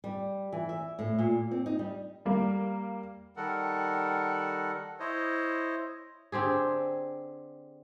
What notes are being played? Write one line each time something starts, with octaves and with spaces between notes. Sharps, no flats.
G3
E3
E5
A2
A#2
C4
D#4
G3
G3 A#3
D#3 G3 A4 A#4 F#5
E4 C5 C#5 D#5
D3 C4 G4 G#4